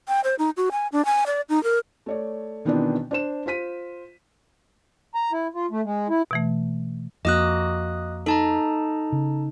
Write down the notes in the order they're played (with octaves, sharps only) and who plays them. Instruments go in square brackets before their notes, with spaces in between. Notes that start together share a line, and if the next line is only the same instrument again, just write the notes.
[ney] G5
C5
D#4
F#4
G#5
D4
G#5
D5
D#4
A#4
[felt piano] A3 C#5 D5
B2 D#3 E3 B3 C4 D4
D4 C5 E7
F4 C5 B6 D#7
[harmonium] A#5
E4
F4
A3
G#3
E4
[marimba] B2 E3 A3
[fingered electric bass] F2 [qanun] A#3 F#4 [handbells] D#5 D#6 F#6
[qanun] D#4 [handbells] A4 A5 A#5
[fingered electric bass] C#3